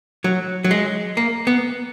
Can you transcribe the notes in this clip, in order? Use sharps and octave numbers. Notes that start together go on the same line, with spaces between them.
F#3
F#3
G#3
A#3
B3